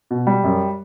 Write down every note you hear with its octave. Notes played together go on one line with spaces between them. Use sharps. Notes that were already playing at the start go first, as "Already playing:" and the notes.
B2
G3
F#2